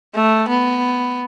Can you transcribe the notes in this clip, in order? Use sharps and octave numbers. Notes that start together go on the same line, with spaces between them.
A3
B3